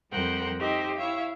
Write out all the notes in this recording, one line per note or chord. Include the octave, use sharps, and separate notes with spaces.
F2 G3 A#4 C5 F#5 G5
D#4 G4 C5 D#5 E5
E4 C#5 E5 F5